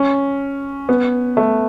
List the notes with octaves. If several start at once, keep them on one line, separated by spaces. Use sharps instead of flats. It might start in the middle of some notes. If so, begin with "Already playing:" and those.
Already playing: C#4
B3
A3